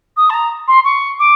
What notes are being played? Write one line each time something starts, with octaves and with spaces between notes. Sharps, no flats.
D#6
A5
A#5
C6
C#6
D6